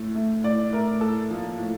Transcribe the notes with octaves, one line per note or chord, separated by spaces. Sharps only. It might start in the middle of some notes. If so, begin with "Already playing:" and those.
Already playing: A2 A3
A3
A2 D5
A3 A#4
A2 A4
F3 A#3
A2